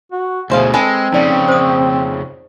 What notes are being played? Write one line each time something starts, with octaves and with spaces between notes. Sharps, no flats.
F#4
D2 B2 E4 G#4 C5 F5
G#3 C4 A4 B4 G#5
F2 C#3 D#4 D5 G5
C5 D#6